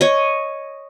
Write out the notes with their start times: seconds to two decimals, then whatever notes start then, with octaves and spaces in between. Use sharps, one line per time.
0.01 C#5 D#5